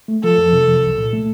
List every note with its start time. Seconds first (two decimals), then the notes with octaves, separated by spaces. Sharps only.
0.08 A3
0.23 F3 A4
0.38 F2
0.53 C3
0.68 F3
0.83 C2
0.98 A#2
1.13 A3